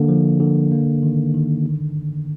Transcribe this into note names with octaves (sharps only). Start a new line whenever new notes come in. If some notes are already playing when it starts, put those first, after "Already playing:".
Already playing: D3 A#3
F3
D3
A#3
D#3
D#3
D3